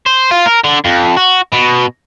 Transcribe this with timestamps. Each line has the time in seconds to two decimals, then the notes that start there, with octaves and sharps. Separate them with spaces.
0.06 C5
0.31 F4
0.46 A#4
0.64 D3
0.85 F2
1.17 F#4
1.52 B2